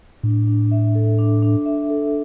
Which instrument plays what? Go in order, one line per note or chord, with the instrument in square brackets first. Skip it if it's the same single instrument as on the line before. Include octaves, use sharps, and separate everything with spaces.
[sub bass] A2 [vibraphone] D4
[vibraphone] D4
E5
A4
D4
D4
E5
A4